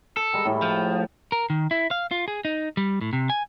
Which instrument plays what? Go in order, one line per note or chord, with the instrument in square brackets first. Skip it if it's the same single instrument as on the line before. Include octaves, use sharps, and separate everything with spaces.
[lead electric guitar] A4
[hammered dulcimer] G3 G#3 A#4
A2 A3 E4
[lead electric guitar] F3
A#4
D#3
E4
F5
F4
G#4
D#4
G3
A2
C3
G#5